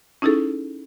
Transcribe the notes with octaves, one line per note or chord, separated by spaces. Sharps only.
C#4 D#4 E4 G#4 A4